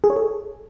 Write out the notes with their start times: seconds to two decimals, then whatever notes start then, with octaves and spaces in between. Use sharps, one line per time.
0.04 G#4
0.10 C#5
0.16 A4